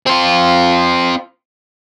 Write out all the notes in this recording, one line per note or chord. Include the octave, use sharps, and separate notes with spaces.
C4 F4